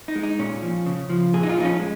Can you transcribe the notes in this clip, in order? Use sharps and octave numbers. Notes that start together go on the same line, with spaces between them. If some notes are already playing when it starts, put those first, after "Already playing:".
D#4
G#3
D#4
A#2 C#4
F3
C#3
F3
A#2 G#4
D#4
F4
F3 D#4
C#4
G#3